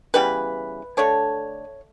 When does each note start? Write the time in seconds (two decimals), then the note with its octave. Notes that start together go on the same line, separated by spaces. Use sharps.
0.14 C#3 E3 G3 B3 B4
0.97 D3 A3 D4 C#5